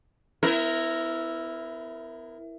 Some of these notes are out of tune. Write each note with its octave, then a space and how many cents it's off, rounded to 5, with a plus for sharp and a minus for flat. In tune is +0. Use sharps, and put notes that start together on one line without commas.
B3 +40 E4 +0 A#4 +0